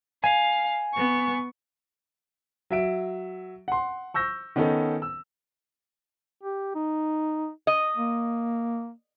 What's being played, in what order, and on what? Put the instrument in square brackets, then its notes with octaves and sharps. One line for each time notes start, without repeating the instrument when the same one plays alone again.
[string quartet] F5 [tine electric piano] G#5
[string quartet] B3 C#6
[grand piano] F#3 E5 D7
F#5 C6
C#6 E6 G6 A#6
D#3 B3 C#4 D#4 A4
E6
[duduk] G4
D#4
[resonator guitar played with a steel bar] D#5
[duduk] A#3